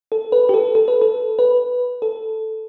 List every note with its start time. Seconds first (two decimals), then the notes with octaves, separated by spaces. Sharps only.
0.12 A4
0.32 B4
0.49 G4
0.54 A4
0.75 A4
0.88 B4
1.02 A4
1.39 B4
2.02 A4